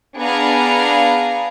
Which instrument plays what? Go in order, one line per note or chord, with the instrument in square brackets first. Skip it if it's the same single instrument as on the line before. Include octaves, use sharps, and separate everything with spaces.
[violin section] B3 D4 G#4 F5 A#5